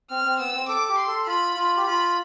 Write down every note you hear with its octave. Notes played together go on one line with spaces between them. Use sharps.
C4 F6
C4
B3 E6
C4
A4 D6
G4
C6
A4
F4 B5
F4
G4
F4 B5